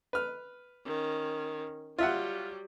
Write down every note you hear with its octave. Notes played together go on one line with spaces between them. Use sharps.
B4 F6
D#3 C#4
F#3 G3 F4 E5 F#5